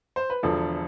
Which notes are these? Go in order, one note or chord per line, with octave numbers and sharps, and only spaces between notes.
C5
B4
E1 E2 D3 F3 A4